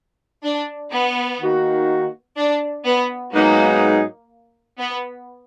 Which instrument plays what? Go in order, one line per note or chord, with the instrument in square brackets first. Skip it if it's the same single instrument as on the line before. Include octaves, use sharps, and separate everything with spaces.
[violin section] D4
B3
[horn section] D#3 A#3 D#4 F#4
[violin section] D4
B3
[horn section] G#2 F#3 B3 D#4 G#4 [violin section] A#3
[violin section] B3